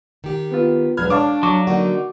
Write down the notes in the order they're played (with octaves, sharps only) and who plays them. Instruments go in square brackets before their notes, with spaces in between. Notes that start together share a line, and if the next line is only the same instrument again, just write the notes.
[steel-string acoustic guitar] D#3 G4
[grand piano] B3 F4
[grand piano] E1 [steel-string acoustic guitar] F#2 F#3 [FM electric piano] B4 F6 G#6
[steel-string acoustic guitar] D4 [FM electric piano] C#5 F5 A5 [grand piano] D6
[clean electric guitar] F#3 [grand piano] C#6 D6
[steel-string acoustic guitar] D3 A#3 D#4 [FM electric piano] F#4 [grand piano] D5